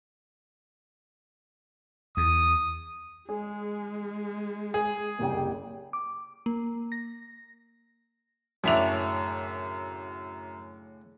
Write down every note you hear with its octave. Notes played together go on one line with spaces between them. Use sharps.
E2 D#6
G#3 G#4
G#4
F#1 C2 G5
D6
A#3
A#6
F#2 A2 C#3 D4 E5 F7